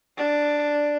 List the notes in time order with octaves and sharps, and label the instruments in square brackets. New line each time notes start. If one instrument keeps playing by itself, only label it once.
[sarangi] D4